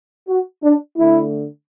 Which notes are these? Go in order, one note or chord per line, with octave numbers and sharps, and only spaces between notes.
F#4
D4
D3 A3 E4